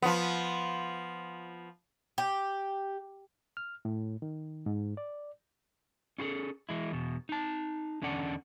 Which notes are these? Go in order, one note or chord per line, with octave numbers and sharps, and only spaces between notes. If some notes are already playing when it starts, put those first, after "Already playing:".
F3 B3
G4
F6
A2
D#3
G#2
D5
C#4 F4 F#4 G#4 A4
E3 G#3 E4
E2 B2
D#4 A5
E2 D3 C#4 D5 F#5 A5